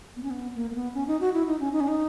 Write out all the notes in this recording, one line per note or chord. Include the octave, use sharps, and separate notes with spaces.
B3
C#4
B3
A#3
A#3
B3
C#4
D#4
F#4
E4
D#4
C#4
D#4
C#4
D#4